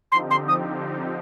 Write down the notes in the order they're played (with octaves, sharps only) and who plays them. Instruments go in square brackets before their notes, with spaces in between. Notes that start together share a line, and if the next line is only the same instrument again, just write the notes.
[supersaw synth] D3 F3 C4 D#4 G4 [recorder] C6
[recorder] C6
D#6